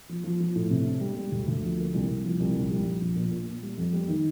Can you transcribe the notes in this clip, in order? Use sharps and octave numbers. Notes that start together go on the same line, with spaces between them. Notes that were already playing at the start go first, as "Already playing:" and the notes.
F3
F3
F3
A2
C3
D4
G3
G3
D2
D2
F3
A#3
C2
C2
F3
C2
A#1
G3
A#1
A#1
A#2
A#2
A#2
G3
F2
G3
D#3